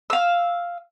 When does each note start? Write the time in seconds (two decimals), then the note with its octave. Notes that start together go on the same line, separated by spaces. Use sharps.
0.10 F5 E6